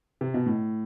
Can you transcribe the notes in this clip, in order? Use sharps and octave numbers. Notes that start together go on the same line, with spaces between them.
C3
B2
A2